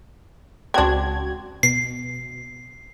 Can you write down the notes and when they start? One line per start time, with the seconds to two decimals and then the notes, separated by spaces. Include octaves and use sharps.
0.74 C#2 C4 D4 F#4 G#6
1.63 B2 C7